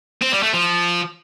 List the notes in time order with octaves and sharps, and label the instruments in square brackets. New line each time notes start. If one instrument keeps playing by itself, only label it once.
[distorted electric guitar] C4
G3
A3
F3